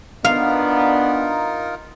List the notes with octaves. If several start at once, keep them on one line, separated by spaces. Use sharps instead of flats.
B3 D4 D#4 F4 A#4 F5